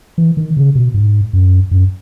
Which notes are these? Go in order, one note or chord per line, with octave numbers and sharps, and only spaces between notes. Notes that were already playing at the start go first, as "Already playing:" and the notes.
E3
D#3
C#3
B2
G#2
F#2
F#2